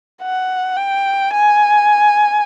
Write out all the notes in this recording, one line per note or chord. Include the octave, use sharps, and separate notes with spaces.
F#5
G5
G#5